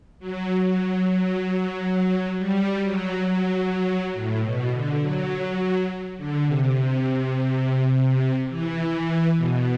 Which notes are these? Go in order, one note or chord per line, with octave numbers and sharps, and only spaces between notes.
F#3
F#3
F#3
G3
F#3
F#3
A2
B2
D3
F#3
D3
C3
C3
E3
B2